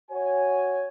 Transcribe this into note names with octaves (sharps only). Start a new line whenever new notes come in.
F#4 C#5 G#5